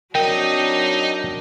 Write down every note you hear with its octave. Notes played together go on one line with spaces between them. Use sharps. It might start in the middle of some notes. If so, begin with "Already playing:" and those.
F#3 C4 D4 D#4 A#4 D#5 G5